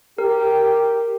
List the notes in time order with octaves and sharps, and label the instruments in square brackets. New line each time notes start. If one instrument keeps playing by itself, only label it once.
[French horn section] G4 [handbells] A#4